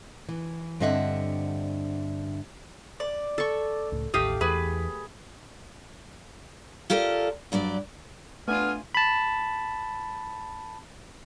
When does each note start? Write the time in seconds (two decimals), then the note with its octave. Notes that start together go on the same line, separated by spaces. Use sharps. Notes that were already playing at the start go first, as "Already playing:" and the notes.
0.29 E3
0.80 G2 D3 C4 D#5 E5 F#5
3.00 D5
3.38 A4 C#6
3.92 C#2 A2
4.14 A1 D#2 A2 A3 G4 F5 D#6
4.41 E2 G#4 B4
6.90 F4 G4 A4 A#4 D5
7.52 G2 F#3 G4 D5
8.48 A3 B3 D4 F4 G#5 F6
8.95 A5 B5